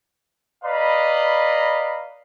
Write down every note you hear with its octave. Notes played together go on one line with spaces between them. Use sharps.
B4 D5 D#5 F5 A#5 B5